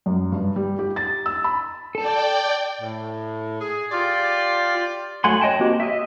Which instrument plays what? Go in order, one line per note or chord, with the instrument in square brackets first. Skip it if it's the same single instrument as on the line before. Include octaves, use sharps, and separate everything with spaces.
[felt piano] F#2
G2
G3
G4
A6
E6
B5
[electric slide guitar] A4 A5 [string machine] D5 G5
[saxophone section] A2
G#4
[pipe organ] F4 [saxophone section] G4 D5
[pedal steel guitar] F#3 A3 F#5 G#5 C6
C#5 D#5 G5 A5
A#3 C4 F#4 G4
D#5 E5